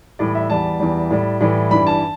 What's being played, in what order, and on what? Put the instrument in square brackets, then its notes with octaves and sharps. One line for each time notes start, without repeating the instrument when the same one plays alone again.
[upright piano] A2 E3 G3 D5
E5
E2 E3 G3 A5
E2 E3 G3
A2 G3
A2 E3 G3
G2 E3 G3 B5
A5